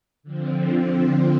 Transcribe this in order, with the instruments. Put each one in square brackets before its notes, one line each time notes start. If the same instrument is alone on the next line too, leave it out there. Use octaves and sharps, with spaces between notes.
[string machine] D3 F3 C4